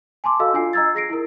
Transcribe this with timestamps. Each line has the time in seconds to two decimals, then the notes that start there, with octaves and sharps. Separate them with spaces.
0.24 G#5 A5 C6 D6
0.40 F#4 A4 D#5 F5 E6
0.53 D4 F4 G#5 C7
0.73 D#5 A#5 E6 G#6 A6
0.95 G#4 A#6 C7 D7
1.10 E4 A#4